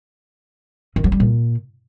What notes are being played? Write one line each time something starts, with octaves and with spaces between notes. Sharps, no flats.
D#3
F#3
G3
A#2